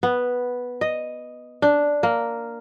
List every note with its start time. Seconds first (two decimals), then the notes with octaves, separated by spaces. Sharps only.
0.03 B3
0.81 D#5
1.62 D4
2.03 A#3